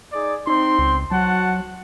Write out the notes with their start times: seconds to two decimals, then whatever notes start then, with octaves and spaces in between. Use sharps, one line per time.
0.13 D#4 G#4 D5
0.47 C4 D#4 C6
0.79 C#2
1.11 F#3 F#4 F#5 A5